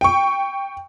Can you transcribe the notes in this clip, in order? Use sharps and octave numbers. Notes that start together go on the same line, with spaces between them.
G5 C#6